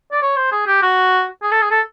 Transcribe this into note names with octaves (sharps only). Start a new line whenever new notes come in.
D5
C#5
C5
G#4
G4
F#4
G#4
A4
G#4
A4